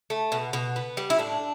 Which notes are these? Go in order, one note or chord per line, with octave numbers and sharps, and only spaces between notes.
A3
B2
B2
B3
G3
E4
A2 D4